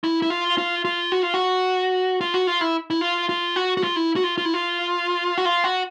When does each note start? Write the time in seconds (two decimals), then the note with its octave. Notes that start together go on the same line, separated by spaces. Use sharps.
0.04 E4
0.22 E4
0.30 F4
0.58 F4
0.85 F4
1.12 F#4
1.23 F4
1.34 F#4
2.21 F4
2.34 F#4
2.47 F4
2.61 E4
2.90 E4
3.01 F4
3.29 F4
3.56 F#4
3.77 F#4
3.83 F4
3.96 E4
4.16 F#4
4.24 F4
4.38 F4
4.45 E4
4.54 F4
5.38 F#4
5.45 F4
5.64 F#4